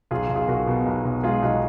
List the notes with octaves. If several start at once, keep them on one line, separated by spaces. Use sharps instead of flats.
B1 F4 G#4
B1
F4 G#4
B1 F#4 A#4
B2
B1
B1
G#3 F4 G#4
B1 D#4 F#4